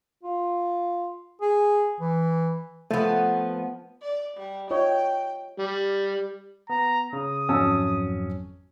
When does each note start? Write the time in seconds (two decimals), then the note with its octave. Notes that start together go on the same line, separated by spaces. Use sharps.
0.23 F4
1.41 G#4
2.01 E3
2.91 F3 A3 B3
4.02 D5
4.37 G3
4.71 F4 C#5 D#5 G5
5.59 G3
6.70 B3 A#5
7.13 C#3 D#6
7.49 G#1 F2 F#3 C#4 A5 E6